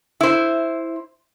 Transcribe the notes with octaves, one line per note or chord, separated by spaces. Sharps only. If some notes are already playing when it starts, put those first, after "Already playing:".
E4 C5